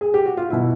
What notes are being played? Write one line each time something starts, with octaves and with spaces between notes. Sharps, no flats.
G#4
G4
F#4
F4
B2 E4